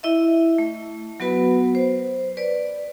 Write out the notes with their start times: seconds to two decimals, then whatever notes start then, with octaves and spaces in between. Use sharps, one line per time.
0.03 E4 D#5 E5
0.58 A3
1.20 F#3 B3 F#4 B4 B5
1.75 C5
2.37 B4 D5